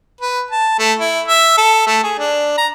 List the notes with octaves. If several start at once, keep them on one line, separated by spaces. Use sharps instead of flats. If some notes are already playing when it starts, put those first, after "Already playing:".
B4
A5
A3
E4
E5
A4
A3
G#4
D4
A#5